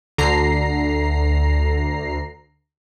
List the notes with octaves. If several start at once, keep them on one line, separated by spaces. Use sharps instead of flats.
D2 D3 A#5 C7